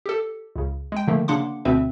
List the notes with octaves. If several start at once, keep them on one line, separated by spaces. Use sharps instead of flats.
G4 A4
C#2 C#3
G#3 G5
D3 D#3 F3 A3 A#3
C#3 A#3 D4 F#5 C6 D6
D2 B2 D3 C4 B4 E5